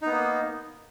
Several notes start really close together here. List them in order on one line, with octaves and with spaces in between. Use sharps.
D#4 B3 A#3